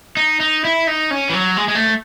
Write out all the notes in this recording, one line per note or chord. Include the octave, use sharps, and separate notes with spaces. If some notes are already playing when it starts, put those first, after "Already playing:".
D#4
D#4
E4
D#4
C#4
E3
F#3
G#3
G#3
A3